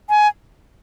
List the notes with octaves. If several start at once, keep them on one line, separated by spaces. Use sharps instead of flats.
G#5